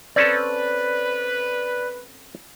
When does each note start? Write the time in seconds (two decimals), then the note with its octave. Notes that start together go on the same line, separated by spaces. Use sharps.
0.16 C4 C#4 A4 B4 D5